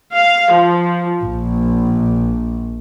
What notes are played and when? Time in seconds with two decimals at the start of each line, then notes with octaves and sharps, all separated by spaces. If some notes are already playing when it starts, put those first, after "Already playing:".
0.14 F5
0.52 F3
1.20 A#1